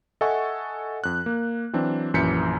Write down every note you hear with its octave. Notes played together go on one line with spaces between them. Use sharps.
A4 D#5 E5 F#5 G#5 C#6
F2 F#6
A#3
E3 F#3 C4 D4
A#1 F#2 E3 G6 B6 C#7